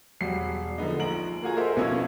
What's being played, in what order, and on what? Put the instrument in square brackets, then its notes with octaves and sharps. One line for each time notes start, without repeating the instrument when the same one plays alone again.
[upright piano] E1 F#3 G3 C7
D3 F3 G#3 B3 D#4
A#1 A#5 D7 F#7
A#3 F4 F#4 G#4 G#5 A#5
A#3 A4 A#4 C5 D#5 E5
A#1 B2 B3 C#4 E4 F5